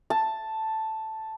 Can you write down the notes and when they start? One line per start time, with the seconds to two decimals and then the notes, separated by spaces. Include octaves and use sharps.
0.10 A5